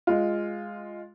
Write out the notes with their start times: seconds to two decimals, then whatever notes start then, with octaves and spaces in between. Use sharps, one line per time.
0.07 G#3 F4